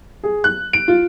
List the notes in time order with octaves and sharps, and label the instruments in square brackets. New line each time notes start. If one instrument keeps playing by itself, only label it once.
[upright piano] G#4
F#6
D7
F4